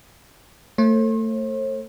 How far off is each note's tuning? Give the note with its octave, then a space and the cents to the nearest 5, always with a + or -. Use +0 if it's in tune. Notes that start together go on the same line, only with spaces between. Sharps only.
A3 +25 C5 +45